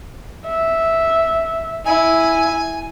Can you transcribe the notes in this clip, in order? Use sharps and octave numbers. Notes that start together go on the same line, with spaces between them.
E5
E4 G#5